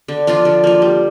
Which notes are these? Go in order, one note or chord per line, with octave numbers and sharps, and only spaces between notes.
D3
F3 D4 F4
D3
F3 A#3
G3